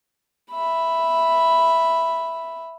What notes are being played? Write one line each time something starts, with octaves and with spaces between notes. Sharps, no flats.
E5 B5